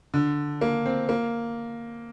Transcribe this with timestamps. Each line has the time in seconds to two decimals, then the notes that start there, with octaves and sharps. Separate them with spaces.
0.14 D3
0.61 A#3
0.86 C4
1.09 A#3